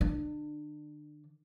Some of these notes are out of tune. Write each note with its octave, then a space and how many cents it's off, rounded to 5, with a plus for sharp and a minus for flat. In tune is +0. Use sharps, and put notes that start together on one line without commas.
D3 +40 D4 +30